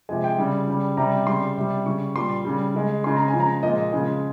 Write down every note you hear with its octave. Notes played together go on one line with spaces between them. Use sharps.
C3 F3 G#3 G#5
G5
C#3 G3
C#3 G3
C3 G3 A#5
C#3 G3 C6
C3 G3
C#3 G3 C#6
A#2 G3 C6
C#3 G3
C#3 G#3
C#3 G#3 C6
A#5
G#5
C#3 F3 G#3
A#5
A#2 F3 G#3 D#5
C#3 F3 G#3